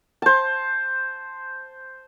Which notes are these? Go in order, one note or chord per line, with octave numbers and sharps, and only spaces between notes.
C5 A5